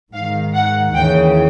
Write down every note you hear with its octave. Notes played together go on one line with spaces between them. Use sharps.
G#2 D#3 F5
F#5
D#2 C#3 E3 G5